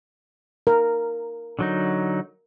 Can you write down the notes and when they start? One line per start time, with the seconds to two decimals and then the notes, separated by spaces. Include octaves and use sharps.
0.67 A#4
1.59 D3 F#3 D#4